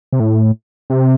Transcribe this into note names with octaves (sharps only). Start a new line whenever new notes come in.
C3
A2
C3